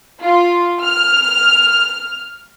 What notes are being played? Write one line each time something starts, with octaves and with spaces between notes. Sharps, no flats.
F4
F6